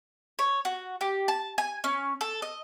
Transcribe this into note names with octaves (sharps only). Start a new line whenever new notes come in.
C#5
F#4
G4
A5
G#5
C#4
A4
D#5